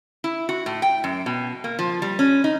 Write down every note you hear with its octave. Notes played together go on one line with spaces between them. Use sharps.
E4
F#4
A2
G5
F#2
B2
A#3
F3
G3
C#4
D#4